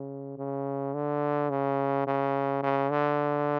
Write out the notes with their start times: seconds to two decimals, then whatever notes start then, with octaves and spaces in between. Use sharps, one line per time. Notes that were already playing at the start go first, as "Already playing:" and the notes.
Already playing: C#3
0.38 C#3
0.94 D3
1.50 C#3
2.07 C#3
2.63 C#3
2.91 D3